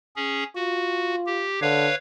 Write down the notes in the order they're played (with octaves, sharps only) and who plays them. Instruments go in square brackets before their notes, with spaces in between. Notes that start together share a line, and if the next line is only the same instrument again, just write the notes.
[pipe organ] C#4 G#4
[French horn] F4 [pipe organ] F#4
[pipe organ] G4
[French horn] D3 [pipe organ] B4 C#5 F5